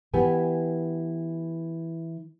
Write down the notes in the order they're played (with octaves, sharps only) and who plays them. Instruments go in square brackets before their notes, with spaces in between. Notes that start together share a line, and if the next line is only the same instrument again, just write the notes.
[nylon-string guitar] E3 B3 E4 G4 G#5